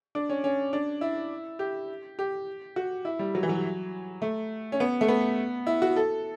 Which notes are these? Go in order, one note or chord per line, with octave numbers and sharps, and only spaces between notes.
D4
C#4
C#4
D4
E4
G4
G4
F#4
E4
G3
F#3
E3
F#3
A3
C#4
B3
A3
B3
E4
F#4
A4